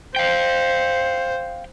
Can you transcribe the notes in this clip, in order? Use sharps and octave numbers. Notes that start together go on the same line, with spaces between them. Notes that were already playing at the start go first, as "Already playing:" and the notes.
C5 F5 G5